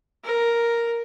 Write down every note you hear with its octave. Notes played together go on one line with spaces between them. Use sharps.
A#4